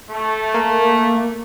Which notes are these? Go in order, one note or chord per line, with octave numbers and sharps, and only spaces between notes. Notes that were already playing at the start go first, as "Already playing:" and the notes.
A3
A#3